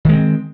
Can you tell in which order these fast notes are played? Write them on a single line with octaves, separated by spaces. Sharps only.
D#3 G#3 C4